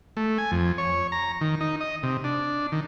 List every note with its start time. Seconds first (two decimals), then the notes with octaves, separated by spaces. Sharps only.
0.17 A3
0.38 G#5
0.52 F2
0.78 C#5
1.12 A#5
1.41 D#3
1.61 D#4
1.81 D#5
2.03 C3
2.24 D4
2.72 D#3